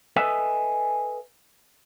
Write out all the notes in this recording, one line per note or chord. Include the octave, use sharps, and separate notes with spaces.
A4 B4 D#5 E5 G#5